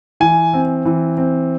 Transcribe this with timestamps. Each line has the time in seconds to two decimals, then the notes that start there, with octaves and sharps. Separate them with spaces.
0.20 E3 G#5
0.53 C4
0.85 E3
1.17 C4